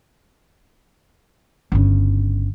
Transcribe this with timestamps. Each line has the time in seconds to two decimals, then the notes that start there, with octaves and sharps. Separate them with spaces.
1.72 G1 C#3